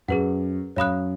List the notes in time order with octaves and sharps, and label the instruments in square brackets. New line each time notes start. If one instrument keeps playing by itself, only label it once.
[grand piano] F#2 [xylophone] G#4 B4 F#5
[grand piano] F#2 [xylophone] C#5 F5 B5 D#6 F#6